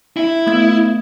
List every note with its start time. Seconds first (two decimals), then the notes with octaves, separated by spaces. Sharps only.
0.17 E4
0.47 A3 B3 G#6